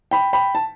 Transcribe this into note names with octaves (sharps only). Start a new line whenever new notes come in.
G5 B5
G5 B5
A5